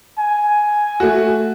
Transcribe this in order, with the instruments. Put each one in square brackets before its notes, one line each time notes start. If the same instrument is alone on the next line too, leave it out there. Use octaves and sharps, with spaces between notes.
[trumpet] G#5
[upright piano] A3 F#4